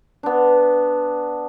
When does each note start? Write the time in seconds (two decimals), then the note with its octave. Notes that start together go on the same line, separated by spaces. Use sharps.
0.23 B3 D4